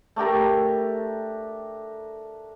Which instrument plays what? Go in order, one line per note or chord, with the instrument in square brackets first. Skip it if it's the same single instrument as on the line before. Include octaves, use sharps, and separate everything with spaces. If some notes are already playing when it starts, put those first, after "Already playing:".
[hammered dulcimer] A3 D4 G4 A#4